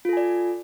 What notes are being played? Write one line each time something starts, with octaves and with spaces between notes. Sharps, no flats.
F4 A4 D5 G#5